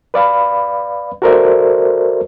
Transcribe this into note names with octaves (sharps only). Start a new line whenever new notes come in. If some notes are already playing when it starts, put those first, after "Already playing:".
B4 D5 F5 B5
F#4 A4 A#4 C5 D5 E5